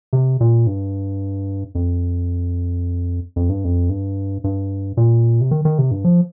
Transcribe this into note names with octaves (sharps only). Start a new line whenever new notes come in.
C3
A#2
G2
F2
F2
G2
F2
G2
G2
A#2
C3
D#3
D#3
C3
G2
F3